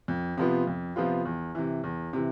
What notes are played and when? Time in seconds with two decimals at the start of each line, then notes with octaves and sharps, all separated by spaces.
0.08 F2
0.38 C3 F3 B3 F4
0.67 F2
0.96 C3 F3 B3 F4
1.25 E2
1.55 C3 E3
1.84 E2
2.13 C3 E3